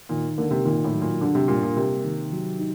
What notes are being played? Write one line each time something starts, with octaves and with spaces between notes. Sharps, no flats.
A#2 D#3
D3 A#3
C3
A#2 D#3
A2
F#3
A#2
G2 D3
C3
A#2 G3
A#2
C3 A#3
D#3
F#3
D#4